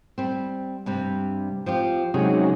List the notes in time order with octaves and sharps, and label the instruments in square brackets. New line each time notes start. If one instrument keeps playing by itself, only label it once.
[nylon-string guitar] G3 C4
G2 C3 G3
[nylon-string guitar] F3 C4 G4 [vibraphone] C5
[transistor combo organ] C3 F#3 G#3 [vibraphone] C#4 D#4 C#5 [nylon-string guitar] G#4